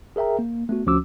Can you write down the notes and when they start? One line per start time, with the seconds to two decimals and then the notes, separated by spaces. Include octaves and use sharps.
0.16 G#4 A#4 E5 G5 A#5
0.39 A#3
0.69 A3 B3 F#4
0.86 D2 F3 C#4 F#4 D6 E6